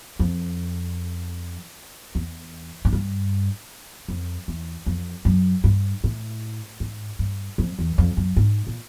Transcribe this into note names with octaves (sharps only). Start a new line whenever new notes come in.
F2
E2
G#2
G2
F2
E2
F2
F#2
G2
A2
G#2
G2
F2
E2
F2
F#2
G#2
A#2